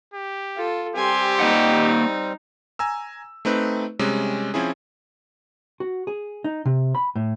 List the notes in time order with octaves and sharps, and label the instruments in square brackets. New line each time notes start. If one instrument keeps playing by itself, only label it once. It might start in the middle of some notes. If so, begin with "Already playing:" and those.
[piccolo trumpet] G4
[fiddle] F4 A4
[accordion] G3 C4 [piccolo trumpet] G4 [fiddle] G#5 C6
[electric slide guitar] A#3 D#5 F#5 [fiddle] D#4
[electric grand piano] G#5 A#5 E6
A3 C4 D#4 B4
C3 G3 G#3 C#4
F3 C4 C#4 E4 G#4
[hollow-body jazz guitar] F#4
G#4
D#4
C3
B5
A2